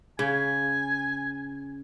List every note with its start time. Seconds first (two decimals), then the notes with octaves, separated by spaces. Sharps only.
0.19 C#3 G#5